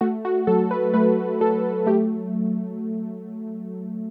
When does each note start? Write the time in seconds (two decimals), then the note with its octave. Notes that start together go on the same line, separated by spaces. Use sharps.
0.01 A3 F#4
0.25 F#4
0.47 F#3 A4
0.71 B4
0.94 A3 B4
1.41 F#3 A4
1.86 A3 G4